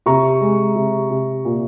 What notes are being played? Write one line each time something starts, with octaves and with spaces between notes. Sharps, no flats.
C3 A#5 C#6
G#3
C3
C3
A#2